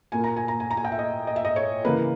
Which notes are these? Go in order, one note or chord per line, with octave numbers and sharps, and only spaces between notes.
A#2 A#3 G#5
A#5
G#5
A#5
G#5
A#5
G#5
G5
E5
D#5
D#5
E5
D#5
C#5
C#3 E3 A#3 B4